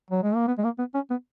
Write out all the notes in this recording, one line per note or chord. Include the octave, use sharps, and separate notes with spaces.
F#3
G#3
A#3
B3
G#3
A#3
B3
C#4
B3